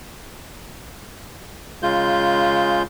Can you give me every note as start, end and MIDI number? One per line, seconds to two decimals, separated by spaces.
1.83 2.83 49
1.83 2.83 56
1.83 2.83 65
1.83 2.83 91